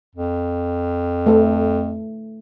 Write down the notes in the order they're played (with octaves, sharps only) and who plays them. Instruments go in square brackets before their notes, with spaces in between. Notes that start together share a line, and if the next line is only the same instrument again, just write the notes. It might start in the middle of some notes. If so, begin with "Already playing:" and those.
[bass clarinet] F2
[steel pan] A3 A4